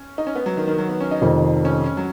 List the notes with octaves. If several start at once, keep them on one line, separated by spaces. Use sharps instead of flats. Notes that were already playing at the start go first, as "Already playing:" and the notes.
Already playing: C#4
D#4
C#4
B3
F#3
D#3
D#3
F#3
B3
C#4
D#4
F1 F2 D#3
C#4
C#4
F#3